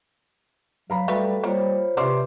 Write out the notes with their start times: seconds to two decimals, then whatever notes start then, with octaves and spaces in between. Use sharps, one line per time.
0.90 F#3 F5 A#5 B5
1.08 G3 A3 F#4 A4 B4
1.44 G3 A#3 F4 C5 C#5
1.97 C3 C#4 E4 G4 B4 D5 C6 D6